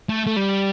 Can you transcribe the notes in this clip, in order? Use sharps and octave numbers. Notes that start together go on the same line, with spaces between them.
A3
A3
G3